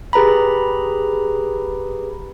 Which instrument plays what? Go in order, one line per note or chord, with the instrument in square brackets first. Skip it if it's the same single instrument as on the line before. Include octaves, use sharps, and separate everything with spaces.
[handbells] G4 G#4 B4 A#5 B5